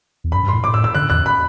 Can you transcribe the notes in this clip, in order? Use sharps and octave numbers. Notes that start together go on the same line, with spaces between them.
E2
F#2 B5
G2
A2 C6
A2 D6
E6
E6
D3 F#6
E2 F#6
B5